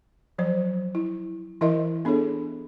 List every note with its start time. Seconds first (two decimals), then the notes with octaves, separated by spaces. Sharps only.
0.38 F3 F#3 C5
0.95 E4
1.61 E3 E4 A#4 D#5 E5
2.05 B3 D4 G#4 A4 C#5